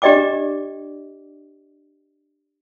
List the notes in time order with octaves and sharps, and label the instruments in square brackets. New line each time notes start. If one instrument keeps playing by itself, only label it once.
[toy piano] D4 G4 D5 D#5 G5 D6